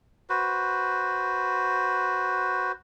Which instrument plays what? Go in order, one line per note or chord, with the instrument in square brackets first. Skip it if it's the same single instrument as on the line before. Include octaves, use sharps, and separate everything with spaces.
[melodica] F#4 B4 C5